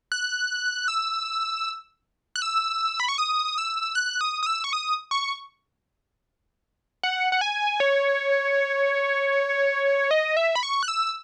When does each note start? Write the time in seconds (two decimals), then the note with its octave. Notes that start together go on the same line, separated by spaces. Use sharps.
0.12 F#6
0.88 E6
2.36 F#6
2.42 E6
3.00 B5
3.08 C#6
3.18 D#6
3.58 E6
3.95 F#6
4.21 D#6
4.43 D#6
4.46 E6
4.64 C#6
4.73 D#6
5.11 C#6
7.03 F#5
7.32 F#5
7.41 G#5
7.80 C#5
10.11 D#5
10.37 E5
10.56 B5
10.63 C#6
10.83 F#6
10.88 E6